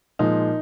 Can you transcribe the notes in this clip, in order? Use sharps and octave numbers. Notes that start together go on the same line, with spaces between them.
A#2 F3 G#3 D#4